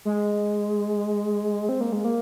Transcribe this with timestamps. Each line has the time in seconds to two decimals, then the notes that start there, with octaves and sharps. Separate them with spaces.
0.05 G#3
1.69 C4
1.81 A#3
1.92 G#3
2.04 A#3